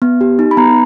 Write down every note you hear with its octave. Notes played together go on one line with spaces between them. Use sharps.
B3
G4
D#4
B5
B3 A#5